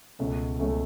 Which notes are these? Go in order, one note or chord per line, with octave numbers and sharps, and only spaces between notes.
C#2 B2 A3 C#4
C#2 B2 A3 C#4